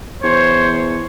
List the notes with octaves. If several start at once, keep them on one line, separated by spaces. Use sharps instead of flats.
E2 C5 C#5